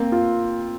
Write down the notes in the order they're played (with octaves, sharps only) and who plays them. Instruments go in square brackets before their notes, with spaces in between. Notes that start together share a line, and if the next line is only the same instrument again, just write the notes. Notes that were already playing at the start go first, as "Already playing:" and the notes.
Already playing: [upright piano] A#3 C4
F4